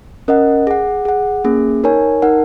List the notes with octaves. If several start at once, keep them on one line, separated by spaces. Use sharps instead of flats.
C#4 A#4 D#5 F#5
G#4 F#5
G#4 F#5
A#3 C#4 G#4
D#4 A#4 C#5 G#5
D#4 A#4 F#5